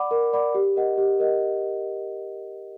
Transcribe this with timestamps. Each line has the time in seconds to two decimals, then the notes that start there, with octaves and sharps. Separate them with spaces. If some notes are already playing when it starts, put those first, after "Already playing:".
Already playing: D5 F#5 B5 D6
0.11 A#4
0.33 D5 F#5 B5 D6
0.55 G4
0.76 A#4 D#5 F#5
0.98 G4
1.19 A#4 D#5 F#5